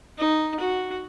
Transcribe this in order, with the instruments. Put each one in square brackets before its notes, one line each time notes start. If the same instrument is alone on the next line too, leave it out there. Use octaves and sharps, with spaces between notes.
[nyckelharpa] D#4
F#4